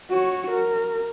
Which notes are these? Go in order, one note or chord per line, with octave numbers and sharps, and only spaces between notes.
F#4 C#5
A#4